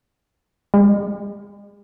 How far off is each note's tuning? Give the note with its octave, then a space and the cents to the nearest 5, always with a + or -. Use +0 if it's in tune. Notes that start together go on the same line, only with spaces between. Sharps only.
G#3 -35